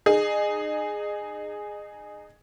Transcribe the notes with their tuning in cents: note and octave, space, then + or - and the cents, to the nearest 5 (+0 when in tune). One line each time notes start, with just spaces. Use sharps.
D#4 -30 G#4 +0